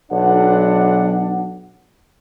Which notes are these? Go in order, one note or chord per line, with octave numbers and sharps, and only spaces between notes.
B1 D4 F#5